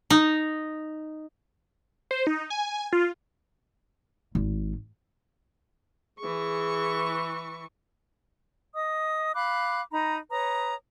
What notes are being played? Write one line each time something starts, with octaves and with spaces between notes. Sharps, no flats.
D#4
C5
D#4
G#5
F4
G#1
E3 G#4 C#6
D#5 D#6
F5 B5 D6 F#6
D#4 A#5 B5
B4 C#5 A#5 D#6